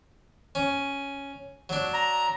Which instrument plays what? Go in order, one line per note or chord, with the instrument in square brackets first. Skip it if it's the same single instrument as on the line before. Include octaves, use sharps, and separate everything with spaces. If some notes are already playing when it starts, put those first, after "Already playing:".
[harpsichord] C#4
F#3 D4
[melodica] A#5